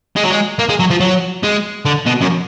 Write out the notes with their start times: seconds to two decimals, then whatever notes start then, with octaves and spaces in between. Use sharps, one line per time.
0.16 G#3
0.24 F#3
0.31 G#3
0.59 A#3
0.69 G#3
0.79 F#3
0.91 F3
1.01 F#3
1.43 G#3
1.85 D3
2.06 B2
2.21 F#2